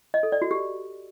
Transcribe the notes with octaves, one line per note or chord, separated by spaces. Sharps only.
D#5
A4
D5
F#4
G4